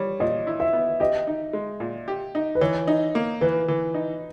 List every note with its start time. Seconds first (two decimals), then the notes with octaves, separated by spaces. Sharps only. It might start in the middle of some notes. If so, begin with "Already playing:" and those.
Already playing: G3 C#5
0.20 A#2 D#5
0.47 E4
0.60 E5
0.73 B3
1.00 G4 D#5
1.27 D#4
1.53 G#3
1.80 A#2
2.08 G4
2.35 D#4
2.55 B4
2.61 E3 C#5
2.87 D#4
3.15 A#3
3.41 E3 B4
3.68 E3
3.94 D#4